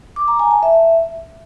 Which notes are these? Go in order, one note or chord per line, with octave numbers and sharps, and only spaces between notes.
D6
A#5
G#5
A5
E5